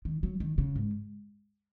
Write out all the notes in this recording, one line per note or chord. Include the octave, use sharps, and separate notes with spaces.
D#3
F#3
D#3
C#3
G#2